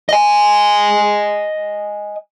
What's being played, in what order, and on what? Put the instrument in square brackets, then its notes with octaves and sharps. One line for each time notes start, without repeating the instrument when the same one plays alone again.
[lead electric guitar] D#5 G#5